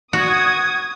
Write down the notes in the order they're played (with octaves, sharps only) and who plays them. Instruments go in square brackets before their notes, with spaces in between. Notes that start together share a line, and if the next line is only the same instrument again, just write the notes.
[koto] F#4 [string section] D#6 G#6